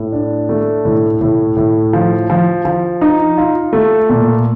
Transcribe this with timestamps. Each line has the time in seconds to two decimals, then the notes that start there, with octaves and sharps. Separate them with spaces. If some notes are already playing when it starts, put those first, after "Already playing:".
Already playing: A2
0.12 D4
0.49 A3
0.85 A2
1.21 A2
1.56 A2
1.93 F3
2.30 F3
2.65 F3
3.01 D#4
3.37 F4
3.73 A3
4.10 A#2